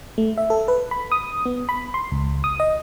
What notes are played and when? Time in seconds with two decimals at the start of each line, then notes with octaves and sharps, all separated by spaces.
0.18 A3
0.38 E5
0.50 A4
0.68 B4
0.91 B5
1.12 D#6
1.46 B3
1.69 B5
1.94 C6
2.12 C#2
2.44 D#6
2.60 D#5